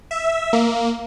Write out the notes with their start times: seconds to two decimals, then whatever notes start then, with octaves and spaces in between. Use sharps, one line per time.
0.11 E5
0.53 A#3